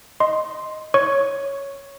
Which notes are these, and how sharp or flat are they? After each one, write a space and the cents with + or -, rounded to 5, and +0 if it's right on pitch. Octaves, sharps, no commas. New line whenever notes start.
D#5 +0 C6 +0
C#5 +0 C#6 +0